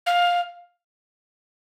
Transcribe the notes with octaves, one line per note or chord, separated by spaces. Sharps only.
F5